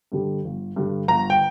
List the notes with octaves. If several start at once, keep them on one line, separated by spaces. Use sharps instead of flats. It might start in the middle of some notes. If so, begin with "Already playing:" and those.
G2 D3 G3
G1
G2 D3 G3
G1 A#5
G5